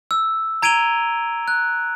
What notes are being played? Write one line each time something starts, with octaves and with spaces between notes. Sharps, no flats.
E6
A#5 G#6 D7 D#7 F7 G7
F#6